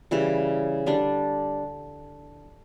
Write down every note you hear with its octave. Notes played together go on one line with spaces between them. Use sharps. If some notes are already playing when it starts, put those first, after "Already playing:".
C#3 E3 G3
D3 G3 D4